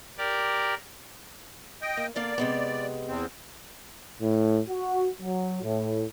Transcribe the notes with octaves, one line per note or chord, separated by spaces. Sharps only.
G4 A#4 D5
D#5 G5
A#3
D3 A#3 D5 F5
C3 G#3 B3
E2 C4
A2
F#4
F#3
A2